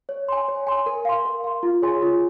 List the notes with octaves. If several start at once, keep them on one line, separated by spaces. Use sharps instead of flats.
C#5
G#5 C6
C#5
G#5 C6
A#4
F5 C6
A#4
F5 C6
F4
G#4 C#5 G#5 C6
F4